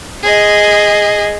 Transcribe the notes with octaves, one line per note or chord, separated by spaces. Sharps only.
G#4 D#5